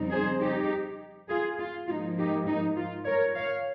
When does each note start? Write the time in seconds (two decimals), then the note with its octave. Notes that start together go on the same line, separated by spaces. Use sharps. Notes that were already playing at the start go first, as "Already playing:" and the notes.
Already playing: F2 C#3 G3 C4 D#4
0.11 G#4 C5
0.41 D#4 G4
1.29 F4 G#4
1.59 F4
1.88 G#2 F3 A#3 D#4 F4
2.17 D#4 G4
2.47 D#4
2.77 F4
3.06 A#4 C#5
3.35 C#5 F5